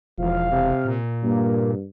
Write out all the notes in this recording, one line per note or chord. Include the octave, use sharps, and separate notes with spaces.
E1 F3 F5
C3
A#2
G2 A#3